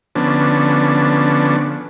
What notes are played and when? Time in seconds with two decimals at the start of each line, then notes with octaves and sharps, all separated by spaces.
0.15 D3 F3 B3 C#4 D4